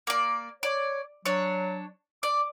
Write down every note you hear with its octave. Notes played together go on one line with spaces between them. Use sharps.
A#3 D5
C#5 D5
F#3 D4 C#5
D5 D6